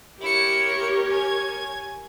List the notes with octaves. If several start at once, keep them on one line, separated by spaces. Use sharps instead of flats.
E4 G4 A#4 C#5 C#7
G#5 G#6